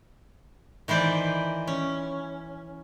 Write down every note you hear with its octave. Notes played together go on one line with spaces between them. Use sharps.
D#3 E3 B4 C5 D5
C#4